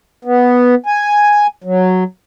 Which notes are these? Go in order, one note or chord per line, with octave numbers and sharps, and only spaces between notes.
B3
G#5
F#3